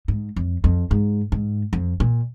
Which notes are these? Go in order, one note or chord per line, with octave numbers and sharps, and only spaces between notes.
G#2
F2
F2
G#2
G#2
F2
A#2